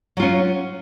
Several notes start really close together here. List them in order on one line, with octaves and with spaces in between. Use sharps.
F#3 F4 C#4